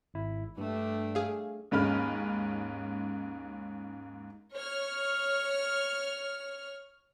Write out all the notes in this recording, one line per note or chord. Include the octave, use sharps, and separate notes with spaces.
G#1 E4
G2 G3 A3 D4
G#4 F5
D#2 G#2 C#4 B5 F6
C#5 F6